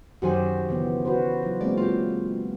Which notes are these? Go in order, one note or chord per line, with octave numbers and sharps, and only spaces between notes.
F#2 D#3 F#4 G4 C5 G#5
C#3 E3 B3
F#4 B4 C5
F#3 F4
G#3 A#3 C4 D5
F4 G4